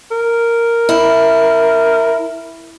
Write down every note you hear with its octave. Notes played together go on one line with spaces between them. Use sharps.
A#4
E4